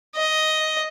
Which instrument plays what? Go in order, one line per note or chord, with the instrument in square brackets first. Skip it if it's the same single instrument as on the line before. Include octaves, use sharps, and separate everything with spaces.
[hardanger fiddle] D#5